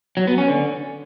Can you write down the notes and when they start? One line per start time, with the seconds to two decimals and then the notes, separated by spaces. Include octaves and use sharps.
0.17 F#3
0.27 B3
0.38 C#4
0.48 D3